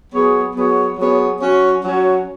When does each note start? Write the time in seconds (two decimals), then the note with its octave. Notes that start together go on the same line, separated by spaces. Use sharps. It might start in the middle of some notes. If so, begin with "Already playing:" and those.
0.10 F#3 B3 G#4 C#5
0.53 F#3 B3 G#4 C#5
0.95 F#3 B3 G#4 C#5
1.39 F#3 C#4 F#4 C#5
1.82 F#3 C#4 F#4 C#5